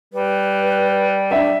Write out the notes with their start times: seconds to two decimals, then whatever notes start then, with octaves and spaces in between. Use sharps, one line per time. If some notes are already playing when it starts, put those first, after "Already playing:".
0.13 G3 B4
1.31 D4 E5